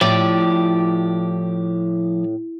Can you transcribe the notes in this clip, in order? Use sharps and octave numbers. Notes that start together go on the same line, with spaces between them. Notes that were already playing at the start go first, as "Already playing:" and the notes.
A2 F3 G4 D5